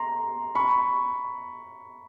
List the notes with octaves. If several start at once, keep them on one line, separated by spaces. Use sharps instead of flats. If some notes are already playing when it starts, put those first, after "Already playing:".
Already playing: A#5 C6
B5 C#6